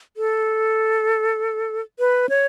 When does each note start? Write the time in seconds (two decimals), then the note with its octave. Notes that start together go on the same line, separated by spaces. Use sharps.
0.17 A4
1.99 B4
2.29 C#5